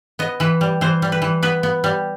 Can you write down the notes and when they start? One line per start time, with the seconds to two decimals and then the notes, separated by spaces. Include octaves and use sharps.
0.19 B3 D#5
0.40 E3 B4
0.61 G3
0.81 E3 C5
1.02 G3
1.12 B4
1.22 E3
1.43 B3 B4
1.63 B3
1.84 G3